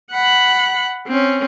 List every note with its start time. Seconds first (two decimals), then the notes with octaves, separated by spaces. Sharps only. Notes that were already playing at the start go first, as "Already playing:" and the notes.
0.11 F#5 B5
1.07 C4 C#4